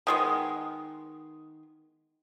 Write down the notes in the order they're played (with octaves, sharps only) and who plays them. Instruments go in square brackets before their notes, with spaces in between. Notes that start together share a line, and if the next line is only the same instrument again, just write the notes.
[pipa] D#3 G#3 B3